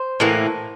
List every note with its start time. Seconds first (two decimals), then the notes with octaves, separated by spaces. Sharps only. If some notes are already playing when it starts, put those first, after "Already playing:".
Already playing: C5
0.20 A2 E3 A#3